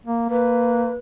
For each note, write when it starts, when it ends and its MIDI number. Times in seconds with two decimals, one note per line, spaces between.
0.05 0.26 58
0.29 0.94 58
0.29 0.96 71